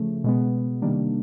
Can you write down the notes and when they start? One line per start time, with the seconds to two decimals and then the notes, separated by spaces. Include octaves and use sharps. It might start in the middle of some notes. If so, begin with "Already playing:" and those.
Already playing: C#3 F3 A3
0.24 B2 G#3 B3
0.82 C3 D#3 G3 A#3 D4